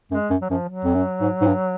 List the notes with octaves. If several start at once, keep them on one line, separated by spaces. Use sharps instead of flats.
F#2 G#3
F#2
F#3
F#2 F3
F#3
F2
F#2
G#2
G#2
G2